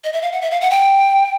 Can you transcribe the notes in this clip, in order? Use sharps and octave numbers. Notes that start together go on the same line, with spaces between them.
D#5
E5
F5
F#5
E5
F5
F#5
G5